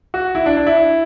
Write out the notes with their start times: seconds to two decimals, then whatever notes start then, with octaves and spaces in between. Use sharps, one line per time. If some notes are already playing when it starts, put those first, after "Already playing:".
0.14 F#4
0.35 E4
0.46 D4
0.56 D4
0.67 E4